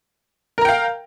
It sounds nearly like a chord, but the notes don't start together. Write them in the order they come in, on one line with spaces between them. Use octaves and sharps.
A#4 A#5 G5 F5